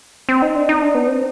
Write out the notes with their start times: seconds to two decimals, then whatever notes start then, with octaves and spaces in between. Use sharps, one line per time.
0.29 C4
0.42 D#4
0.56 D4
0.69 D#4
0.82 D4
0.95 B3
1.08 C4